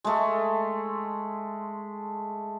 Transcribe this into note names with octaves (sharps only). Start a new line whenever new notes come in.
G#3 A3